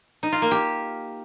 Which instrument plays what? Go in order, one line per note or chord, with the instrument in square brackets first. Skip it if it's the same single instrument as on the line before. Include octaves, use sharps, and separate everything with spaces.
[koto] D#4
F4
A#3
G4